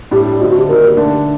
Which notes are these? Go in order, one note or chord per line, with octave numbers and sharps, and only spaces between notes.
A2 G3 D4 G4
D3 A3 C4 D#4 F#4
F#4
G4
D#3 G3 A#3 A#4
D3 A3 D4